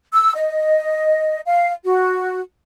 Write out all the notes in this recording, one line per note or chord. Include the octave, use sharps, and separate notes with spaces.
E6
D#5
F5
F#4